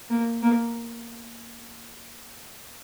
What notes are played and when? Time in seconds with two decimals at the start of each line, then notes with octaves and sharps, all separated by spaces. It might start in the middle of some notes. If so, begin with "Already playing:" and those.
0.10 A#3
0.42 A#3